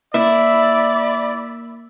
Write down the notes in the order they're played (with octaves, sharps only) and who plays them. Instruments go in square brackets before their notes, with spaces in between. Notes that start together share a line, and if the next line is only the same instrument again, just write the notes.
[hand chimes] A#3 [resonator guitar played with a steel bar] E4 [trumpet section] D5 B5 [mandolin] E5